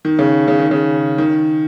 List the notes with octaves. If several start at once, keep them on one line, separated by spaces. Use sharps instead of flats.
D#3
C#3
C#3
D#3
C#3
D#3